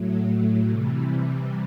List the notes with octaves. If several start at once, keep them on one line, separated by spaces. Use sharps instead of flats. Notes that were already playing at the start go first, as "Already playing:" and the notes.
Already playing: A2 F#3 A3
C3 E3 G3